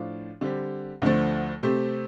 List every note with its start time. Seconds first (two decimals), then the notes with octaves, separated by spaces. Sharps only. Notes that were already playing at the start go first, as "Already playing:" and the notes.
Already playing: A2 F3 D4 F4
0.41 D3 G3 C4 G4
1.02 D2 D3 F3 A3
1.63 C3 A3 C4 G4 C5